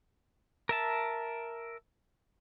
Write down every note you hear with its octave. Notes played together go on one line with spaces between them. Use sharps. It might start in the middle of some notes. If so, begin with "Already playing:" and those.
A#4 E5 A5